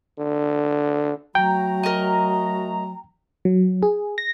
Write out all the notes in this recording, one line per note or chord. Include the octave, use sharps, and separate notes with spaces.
D3
F#3 A3 F#4 G5 A#5
A#4 D#5
F#3
G#4
A#6